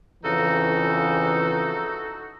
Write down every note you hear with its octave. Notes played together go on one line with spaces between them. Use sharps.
F2 C#3 E3 D#4 F#4 A4